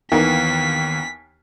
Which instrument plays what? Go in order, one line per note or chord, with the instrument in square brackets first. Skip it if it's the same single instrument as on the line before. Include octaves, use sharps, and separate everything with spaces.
[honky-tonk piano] D#2 [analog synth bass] D#3 [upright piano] E3 B3 A#4 [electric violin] B6